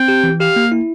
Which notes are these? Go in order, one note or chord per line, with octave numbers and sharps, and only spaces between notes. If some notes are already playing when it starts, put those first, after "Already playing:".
Already playing: C4 G5
G4
E3
G4 F5
A#3
E4